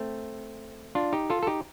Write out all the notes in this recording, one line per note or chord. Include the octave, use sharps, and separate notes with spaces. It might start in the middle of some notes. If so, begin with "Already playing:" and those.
Already playing: A3 C4
D4 F4
D#4 G4
F4 A4
A4
D#4 G4